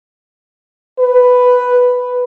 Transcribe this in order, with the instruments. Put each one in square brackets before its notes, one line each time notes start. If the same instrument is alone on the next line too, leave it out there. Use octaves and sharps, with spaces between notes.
[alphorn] B4